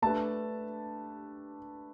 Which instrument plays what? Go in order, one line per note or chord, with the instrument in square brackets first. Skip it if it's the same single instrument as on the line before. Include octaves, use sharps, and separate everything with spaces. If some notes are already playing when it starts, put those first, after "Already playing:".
[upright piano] A3 D4 G4 B4 [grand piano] A5